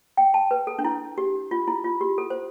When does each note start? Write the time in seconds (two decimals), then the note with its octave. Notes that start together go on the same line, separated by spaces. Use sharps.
0.17 G5
0.34 A5
0.51 B4
0.67 A4
0.79 D4
0.85 E4
1.18 G4
1.51 F4
1.67 E4
1.84 F4
2.01 G4
2.18 A4
2.30 C5